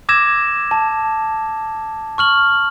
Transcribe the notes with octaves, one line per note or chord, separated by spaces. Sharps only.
D6 E6 G#6 A#6 E7
A5
C#6 F6 F#7